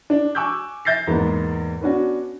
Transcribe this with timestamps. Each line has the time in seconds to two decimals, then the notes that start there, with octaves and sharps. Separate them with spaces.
0.10 D4
0.35 G#5 C#6 D6 E6 F#6 G6
0.85 E5 G6 A6 A#6 C7
1.07 E2 G#2 A#3 B3
1.81 B3 C#4 D4 F#4